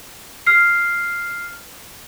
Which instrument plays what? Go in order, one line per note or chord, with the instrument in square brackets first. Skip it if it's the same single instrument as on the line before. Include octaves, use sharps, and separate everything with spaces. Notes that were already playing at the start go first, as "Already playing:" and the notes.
[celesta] F6 C7